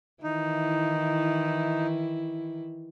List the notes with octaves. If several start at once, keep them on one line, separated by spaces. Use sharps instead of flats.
D#3 E3 D#4 E4